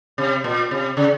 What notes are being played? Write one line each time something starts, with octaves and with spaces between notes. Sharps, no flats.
C3
A#2
C3
C#3